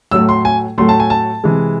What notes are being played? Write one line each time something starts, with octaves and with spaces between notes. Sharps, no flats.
A2 F#3 A3 E6
C6
G#5
A2 F#3 A3 C6
A5
G#5
A5
C3 E3 G#3